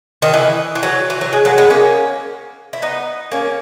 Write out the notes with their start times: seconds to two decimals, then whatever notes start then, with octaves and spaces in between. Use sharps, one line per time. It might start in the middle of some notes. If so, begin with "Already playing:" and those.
0.22 D#3
0.34 E3
0.75 E3
0.83 F#3
1.10 E3
1.21 F#3
1.33 G#3
1.45 F#3 A#3
1.58 G#3 B3
1.70 A#3 C#4
2.73 E4
2.82 B3 D#4
3.32 A#3 C#4